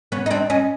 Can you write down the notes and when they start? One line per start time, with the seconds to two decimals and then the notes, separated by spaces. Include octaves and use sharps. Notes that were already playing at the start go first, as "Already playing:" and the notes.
0.12 B3 C#4
0.26 D#4
0.31 C4 D4
0.50 C#4 D#4